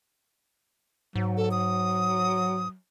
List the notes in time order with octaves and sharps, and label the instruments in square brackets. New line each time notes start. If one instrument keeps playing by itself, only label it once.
[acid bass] G#2 [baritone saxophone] F#3
[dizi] A4
D#6